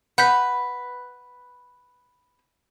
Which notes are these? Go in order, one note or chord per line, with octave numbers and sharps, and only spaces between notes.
B4 F#5 G6 B6